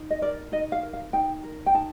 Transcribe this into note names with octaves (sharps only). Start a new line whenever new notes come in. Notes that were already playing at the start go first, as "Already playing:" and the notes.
Already playing: D#4
D#5
A#4 D5
D#4 D#5
F5
A#4
F5
D#4 G5
A#4
G5
D#4 A5